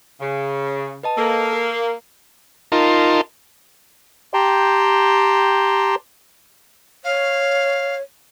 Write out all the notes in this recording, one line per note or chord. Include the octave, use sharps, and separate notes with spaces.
C#3
B4 D#5 A5
A#3 A4 A5 E6
A#4
D#4 F4 A#4 A5 C6
G4 G5 A5 A#5 C6
C#5 F5